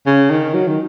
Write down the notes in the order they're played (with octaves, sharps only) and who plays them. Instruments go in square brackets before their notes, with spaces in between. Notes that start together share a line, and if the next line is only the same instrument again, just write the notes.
[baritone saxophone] C#3
D#3
F#3
D#3